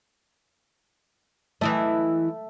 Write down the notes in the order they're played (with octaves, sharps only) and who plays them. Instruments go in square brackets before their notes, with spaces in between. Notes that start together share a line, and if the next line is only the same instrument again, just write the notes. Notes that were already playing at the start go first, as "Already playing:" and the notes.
[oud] E3 E4 D#5 [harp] A3